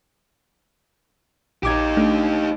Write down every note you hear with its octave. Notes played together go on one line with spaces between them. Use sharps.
A#1 D#4 G4 D6 G#6
A3 D4